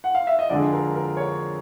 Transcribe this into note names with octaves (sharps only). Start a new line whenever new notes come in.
F#5
F5
E5
D#5
F2 D3 F3 G#3 D5
A#4
A#4
C#5